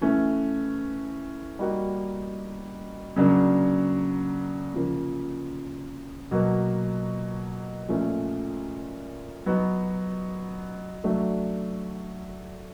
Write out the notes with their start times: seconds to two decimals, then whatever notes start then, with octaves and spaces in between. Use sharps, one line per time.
0.01 E3 A3 C#4
1.59 G3 A#3 D#4 F#4
3.16 C#3 F#3 A#3 D4
4.74 C#3 F3 A#3
6.31 B2 F#3 A#3
7.89 A#2 F3 A3 C#4
9.46 F#3 B3 D#4 F#4
11.04 F#3 A3 D4 F#4